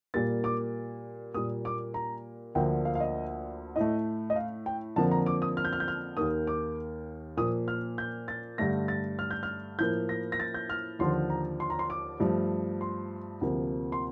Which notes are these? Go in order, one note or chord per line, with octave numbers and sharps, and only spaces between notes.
A#2 G3 A#3 A6
D6
A#2 G3 A#3 D#6
D6
A#5
D2 D3 F3 A#3 G5
F5
F5
D#5
A2 A3 D#5
D#5
F5
G5
F2 D3 F3 A#3 A5
A#5
D6
D#6
F6
G6
F6
G6
F6
D#2 D#3 A#3 D#6
D6
A#2 F3 A#3 D#6
F6
G6
A6
G2 D3 A3 A#6
A6
F6
G6
F6
A2 F3 A#3 G6
A#6
A#6
A6
G6
F6
D#2 D3 F3 C6
A#5
C6
A#5
C6
D6
G2 F3 A3
C6
D2 C3 F3 A#3
C6